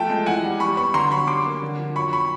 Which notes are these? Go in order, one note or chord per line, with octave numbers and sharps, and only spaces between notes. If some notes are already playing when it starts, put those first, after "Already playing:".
Already playing: F3 A3 G5 A5
G#3
E3 F#5 G#5
G3
G3 B5 C#6
B3 B5 C#6
D3 A#5 C6
F#3 B5 C#6
G3 C6 D6
A#3
D3
F3
F#3 B5 C#6
B5 C#6